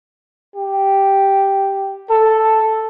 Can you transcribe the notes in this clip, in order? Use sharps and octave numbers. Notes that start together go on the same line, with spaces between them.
G4
A4